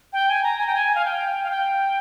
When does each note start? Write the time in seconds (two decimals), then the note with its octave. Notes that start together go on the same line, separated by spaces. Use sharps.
0.13 G5
0.29 G#5
0.43 A#5
0.58 G#5
0.67 G5
0.75 G#5
0.95 F5
1.05 G5
1.43 F5
1.50 G5